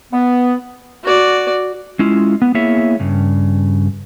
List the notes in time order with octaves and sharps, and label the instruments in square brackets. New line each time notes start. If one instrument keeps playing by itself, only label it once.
[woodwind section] B3
[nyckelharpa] F#4 D5
[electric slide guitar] G#3 C#4 E4 F4
B3
A#3 B3 E4 G#4 C#5 E5
G2 C#3